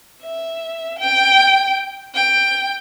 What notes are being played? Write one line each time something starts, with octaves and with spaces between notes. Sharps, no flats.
E5
G5
G5